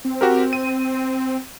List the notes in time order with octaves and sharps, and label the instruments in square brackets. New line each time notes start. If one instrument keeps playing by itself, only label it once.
[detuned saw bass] C4
[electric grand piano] F#4 G4 A#4
D#7